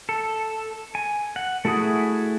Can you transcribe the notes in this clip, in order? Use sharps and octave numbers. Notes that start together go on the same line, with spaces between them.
A4
G#5
F#5
A3 E4 F#4 G#4 D#6